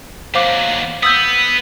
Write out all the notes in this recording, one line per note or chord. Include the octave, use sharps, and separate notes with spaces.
D#2 F#3 C5 F5 D6
B3 D#6 E6 G6